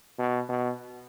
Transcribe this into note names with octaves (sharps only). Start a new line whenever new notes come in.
B2
B2